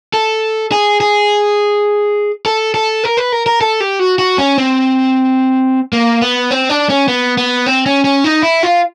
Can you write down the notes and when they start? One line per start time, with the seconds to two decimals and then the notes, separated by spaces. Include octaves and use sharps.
0.14 A4
0.72 G#4
1.01 G#4
2.46 A4
2.74 A4
3.04 A#4
3.17 B4
3.32 A#4
3.46 A#4
3.61 A4
3.80 G4
4.00 F#4
4.19 F#4
4.38 C#4
4.58 C4
5.93 A#3
6.22 B3
6.51 C4
6.70 D4
6.90 C#4
7.08 B3
7.38 B3
7.66 C4
7.86 C#4
8.04 C#4
8.24 D#4
8.43 E4
8.63 F4